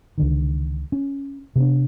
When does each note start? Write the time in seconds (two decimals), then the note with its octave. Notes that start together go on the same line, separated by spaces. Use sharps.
0.18 C#2 D3 D#3
0.92 C#4
1.56 C3 B3 D4